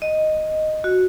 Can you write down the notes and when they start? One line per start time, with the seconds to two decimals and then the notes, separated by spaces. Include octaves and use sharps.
0.02 D#5
0.84 F#4